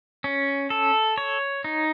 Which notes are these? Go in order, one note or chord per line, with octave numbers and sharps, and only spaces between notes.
C#4
A4
C#5
D#4